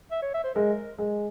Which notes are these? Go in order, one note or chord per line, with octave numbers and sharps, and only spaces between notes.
E5
C#5
E5
C5
G#3 A#4
G#3